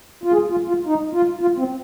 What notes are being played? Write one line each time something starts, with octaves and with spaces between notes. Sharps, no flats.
F4
G#4
F4
F4
D#4
F4
F4
C4